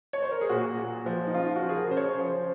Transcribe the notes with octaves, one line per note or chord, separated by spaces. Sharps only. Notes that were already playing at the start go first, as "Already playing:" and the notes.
C#5
C5
A#4
G#4
A#2 F#4
A#2
F3
D#4
C#3 F4
F#4
F3
G#4
A#4
C#3 C5
C#5
F3 C5